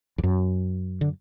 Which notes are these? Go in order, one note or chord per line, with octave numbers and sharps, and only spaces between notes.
E2
F#2
D3